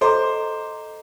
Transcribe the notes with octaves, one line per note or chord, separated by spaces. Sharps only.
A4 C5 D#5 A#5 D6